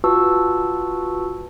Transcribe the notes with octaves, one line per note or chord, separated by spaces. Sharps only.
F4 F#4 B4 A5 C#6 E6